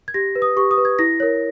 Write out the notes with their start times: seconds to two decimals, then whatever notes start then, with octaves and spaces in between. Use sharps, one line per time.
0.08 G#6
0.14 G4 A#6
0.35 B4
0.42 D#6
0.56 G4 C#6
0.71 D#6
0.78 B4
0.85 G#6
0.99 E4 A#6
1.20 A#4 C#5